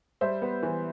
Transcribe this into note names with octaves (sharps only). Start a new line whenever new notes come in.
G3 C5 E5
B3
E3